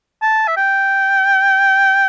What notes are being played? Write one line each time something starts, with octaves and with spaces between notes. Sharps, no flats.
A5
E5
G5